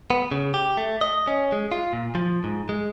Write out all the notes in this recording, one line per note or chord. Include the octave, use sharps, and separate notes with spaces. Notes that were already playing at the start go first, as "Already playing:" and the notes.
B3
C#3
G4
A3
D#5
C#4
G#3
F4
A#2
F3
G#2
G#3